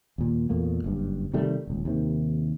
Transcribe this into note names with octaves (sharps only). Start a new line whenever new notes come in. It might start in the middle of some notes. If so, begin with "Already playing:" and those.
D#2 A#2
E2 A#2 A3 A#3
F#1 G2
C3 D#3 G3 A3
D#1 C#2
D#2 C3 D#3